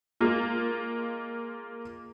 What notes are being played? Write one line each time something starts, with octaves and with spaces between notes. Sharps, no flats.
G#3 A#3 F4